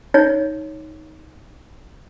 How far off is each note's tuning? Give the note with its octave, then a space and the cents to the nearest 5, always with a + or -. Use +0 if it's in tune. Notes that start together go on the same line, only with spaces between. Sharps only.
D#4 +10 C#5 +0